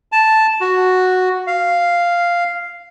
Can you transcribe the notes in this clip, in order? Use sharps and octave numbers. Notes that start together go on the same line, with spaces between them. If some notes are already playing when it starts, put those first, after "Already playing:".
A5
F#4
F5